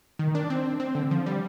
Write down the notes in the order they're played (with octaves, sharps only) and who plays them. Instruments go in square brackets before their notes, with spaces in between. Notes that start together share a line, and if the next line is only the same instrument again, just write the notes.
[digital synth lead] D#3
D4
C4
C4
D3
F3
G3